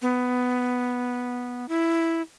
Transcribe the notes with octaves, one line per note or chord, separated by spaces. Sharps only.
B3
E4